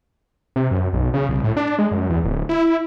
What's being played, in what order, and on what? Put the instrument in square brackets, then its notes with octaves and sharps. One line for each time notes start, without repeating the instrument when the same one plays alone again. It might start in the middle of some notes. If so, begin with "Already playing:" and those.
[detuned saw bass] C3
F#2
B1
C#3
C2
A2
D4
G#3
F#2
E2
D1
E4